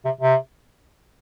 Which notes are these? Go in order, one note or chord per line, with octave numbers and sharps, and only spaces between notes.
C3
C3